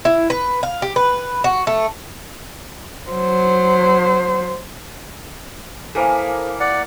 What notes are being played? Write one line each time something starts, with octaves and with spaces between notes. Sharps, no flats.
E4
B4
F5
G4
B4
F#4
A3
F#3 C5
E3 A#3 A4 A#4 C5 F5
D5 F#5